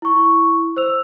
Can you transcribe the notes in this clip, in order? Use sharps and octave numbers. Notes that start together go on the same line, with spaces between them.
E4 C#6
C5 E6 F7